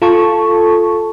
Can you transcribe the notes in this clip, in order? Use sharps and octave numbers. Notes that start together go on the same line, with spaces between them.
F4 A4 A5 C#6